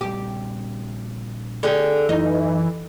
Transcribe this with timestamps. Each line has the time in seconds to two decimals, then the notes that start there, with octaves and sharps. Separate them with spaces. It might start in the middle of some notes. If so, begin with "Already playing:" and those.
0.01 A#1 G3 G4
1.63 D3 G4 G#4
2.09 F#2 E3 D#4